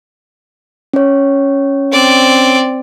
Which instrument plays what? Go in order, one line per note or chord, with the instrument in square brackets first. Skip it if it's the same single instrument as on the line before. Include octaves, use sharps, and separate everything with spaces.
[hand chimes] C#4 C#5
[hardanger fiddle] C4 D5